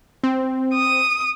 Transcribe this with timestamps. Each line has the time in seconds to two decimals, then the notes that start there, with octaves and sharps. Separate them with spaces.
0.24 C4
0.74 D#6